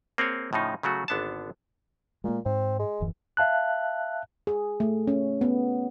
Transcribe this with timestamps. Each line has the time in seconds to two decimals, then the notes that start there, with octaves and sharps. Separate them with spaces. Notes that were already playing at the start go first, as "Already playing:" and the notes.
0.18 A#3 C4 G#4 C#5
0.53 A2 C#3 F3 D#4
0.83 C#3 F#3 A3 F#4
1.08 G#1 D3 B3 D4 A5
2.24 A#2 G#3 A#3
2.46 G#2 C4
2.79 G#3
3.00 D1 F#2 E3
3.37 E5 F5 A5 F#6
4.47 G#4
4.80 A3
5.07 C#4
5.41 B3